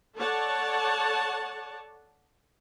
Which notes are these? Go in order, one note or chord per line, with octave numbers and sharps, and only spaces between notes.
A4 C#5 D5 F#5 A5